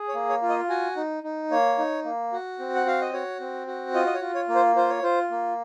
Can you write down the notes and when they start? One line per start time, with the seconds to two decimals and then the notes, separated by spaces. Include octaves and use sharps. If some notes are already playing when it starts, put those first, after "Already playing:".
Already playing: G#4
0.08 C#5
0.14 A#3
0.29 C#5
0.42 F4
0.49 D#5
0.70 F#4 G#5
0.96 D#4
1.23 D#4
1.51 A#3 C#5
1.78 D#4
2.05 A#3
2.32 F#4
2.59 C4
2.75 F#5
2.86 F#4 F5
3.01 D#5
3.13 F#4 C#5
3.40 C4
3.67 F#4
3.94 F4 D#5
4.07 D#5
4.14 C#5
4.21 F4
4.35 C#5
4.49 A#3
4.55 C5
4.76 F4 C5
4.89 C#5
5.03 F4 C5
5.31 A#3